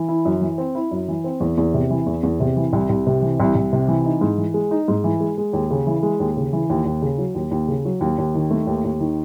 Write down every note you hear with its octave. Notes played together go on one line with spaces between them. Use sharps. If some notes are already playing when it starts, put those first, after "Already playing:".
Already playing: E3
E4
F#2
E3
C4
E4
F#2
E3
C4
E2
E2
C3
E3
E2
E2
C3
E3
C2
C2
C3
E3
C2
C2
C3
E3
D#4
G#2
E3
G#3
D#4
G#2
E3
G#3
G#3
D#2
C#3
E3
G#3
D#2
C#3
E3
D#2
D#2
C#3
F#3
D#2
D#2
C#3
F#3
D#2
D#2
D#3
A3
D#2
D#2
D#3